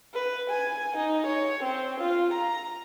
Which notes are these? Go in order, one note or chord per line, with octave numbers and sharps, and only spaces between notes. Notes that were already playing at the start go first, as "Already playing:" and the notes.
B4
G#5
D#4
C#5
C4
F4
A#5